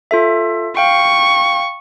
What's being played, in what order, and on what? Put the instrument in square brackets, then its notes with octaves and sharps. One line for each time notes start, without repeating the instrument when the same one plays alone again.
[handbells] F4 A4 E5
[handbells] F5 G5 [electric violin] C#6